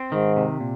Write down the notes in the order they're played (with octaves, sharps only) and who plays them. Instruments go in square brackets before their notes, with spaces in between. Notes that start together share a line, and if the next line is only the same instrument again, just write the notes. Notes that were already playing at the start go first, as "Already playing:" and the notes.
Already playing: [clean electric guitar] C4
[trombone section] G#2 [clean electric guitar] D#3
[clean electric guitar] C3
A#2